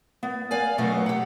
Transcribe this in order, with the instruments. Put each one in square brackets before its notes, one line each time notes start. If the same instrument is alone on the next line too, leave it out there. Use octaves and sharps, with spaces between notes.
[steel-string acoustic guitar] B3
D5 F5 G#5
F#2 B2 E3 F#3 A3 B3
G4 F#5